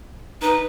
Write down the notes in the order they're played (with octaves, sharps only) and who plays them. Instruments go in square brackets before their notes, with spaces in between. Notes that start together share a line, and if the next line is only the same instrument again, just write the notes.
[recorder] D#4 [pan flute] B4